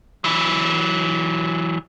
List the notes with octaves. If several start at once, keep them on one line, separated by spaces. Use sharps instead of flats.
E3 F#3